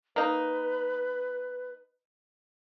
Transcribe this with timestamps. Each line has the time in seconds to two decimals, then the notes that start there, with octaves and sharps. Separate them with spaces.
0.16 A#3 D#4 B4